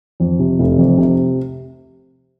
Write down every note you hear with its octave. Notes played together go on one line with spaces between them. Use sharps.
F2
C3
F1
F2
C3